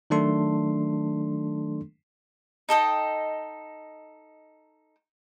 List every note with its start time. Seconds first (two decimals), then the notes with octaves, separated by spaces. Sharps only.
0.10 D#3 F#3 A3 D4 A4 C6
2.69 D#4 A4 D#5 G5